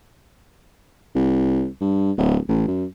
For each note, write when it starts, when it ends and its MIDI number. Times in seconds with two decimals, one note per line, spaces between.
1.15 1.67 36
1.81 2.12 43
2.18 2.37 26
2.49 2.66 33
2.68 2.85 42